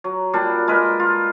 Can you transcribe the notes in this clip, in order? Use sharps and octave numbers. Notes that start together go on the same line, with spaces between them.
F#3
A#2 G3 D4
G#3 A#4 B4
F4